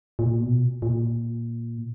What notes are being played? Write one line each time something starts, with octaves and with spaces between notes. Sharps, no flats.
A#2
B2
A#2